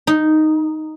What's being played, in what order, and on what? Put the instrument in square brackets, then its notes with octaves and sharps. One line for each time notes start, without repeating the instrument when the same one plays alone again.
[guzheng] D#4